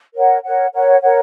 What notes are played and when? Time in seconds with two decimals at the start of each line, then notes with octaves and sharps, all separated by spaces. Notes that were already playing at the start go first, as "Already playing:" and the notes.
0.14 A#4 C#5 F#5
0.44 A#4 C#5 F#5
0.73 A#4 C#5 F#5
1.02 A#4 C#5 F#5